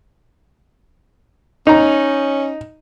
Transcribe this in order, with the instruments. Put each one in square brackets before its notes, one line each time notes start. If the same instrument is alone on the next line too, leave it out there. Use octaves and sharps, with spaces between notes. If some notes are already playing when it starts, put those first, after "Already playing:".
[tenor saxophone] C#4 [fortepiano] D#4 A#5